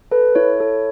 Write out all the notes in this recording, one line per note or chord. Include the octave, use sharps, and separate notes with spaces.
A4 B4
E4 C#5
A4